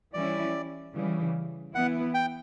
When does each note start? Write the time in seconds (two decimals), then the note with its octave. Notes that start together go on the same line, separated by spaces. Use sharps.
0.13 E3 G3 C#4 E4 D5
0.94 C#3 E3 G3
1.74 E3 B3 E4 F#5
2.14 G5